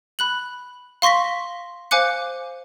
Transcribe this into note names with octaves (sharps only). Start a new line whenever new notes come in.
B5 F#6 F#7
F5 C6 C#6 A#6 B6
C5 F5 G#5 D6 F#6 C#7